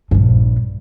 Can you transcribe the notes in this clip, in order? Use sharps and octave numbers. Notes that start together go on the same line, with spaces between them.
A#1 G2